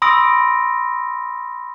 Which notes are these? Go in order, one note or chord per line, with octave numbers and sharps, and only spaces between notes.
B5 C6 D#6 E6 A#6 D7